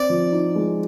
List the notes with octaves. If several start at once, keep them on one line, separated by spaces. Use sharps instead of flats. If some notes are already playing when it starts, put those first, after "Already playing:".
Already playing: C4 D5
F3
D#4
G#3